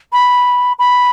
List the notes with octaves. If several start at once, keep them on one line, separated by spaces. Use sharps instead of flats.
B5
B5